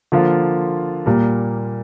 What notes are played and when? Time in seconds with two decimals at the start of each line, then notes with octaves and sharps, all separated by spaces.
0.12 D3 F3 A#3 F4
1.06 A#2 G3 A#3